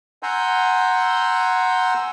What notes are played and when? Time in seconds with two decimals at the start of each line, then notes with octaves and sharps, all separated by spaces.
0.23 F#5 G#5 A#5 C6 E6 G6